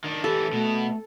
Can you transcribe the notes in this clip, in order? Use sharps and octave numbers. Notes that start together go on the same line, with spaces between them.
D#3 D4
E3 C#4 G4 A4
B2 A3 B3